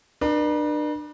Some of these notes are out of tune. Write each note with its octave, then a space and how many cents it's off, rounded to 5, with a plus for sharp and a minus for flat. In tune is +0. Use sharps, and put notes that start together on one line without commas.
D4 +35 B4 -45